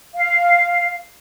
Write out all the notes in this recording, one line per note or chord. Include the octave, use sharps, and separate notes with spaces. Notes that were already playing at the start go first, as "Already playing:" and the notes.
F5